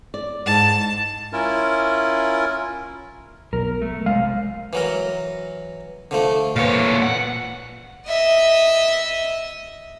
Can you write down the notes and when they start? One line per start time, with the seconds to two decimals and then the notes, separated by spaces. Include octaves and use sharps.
0.14 D5
0.46 G#2 A5
1.33 C#4 E4 F4 A#4
3.53 B1 A#4
3.82 A3
4.06 C3 G#3 F5
4.73 E3 F#3 A#4
6.11 D3 F3 A3
6.56 A#2 E3 C#5 F5
7.02 F#5
8.07 D#5 E5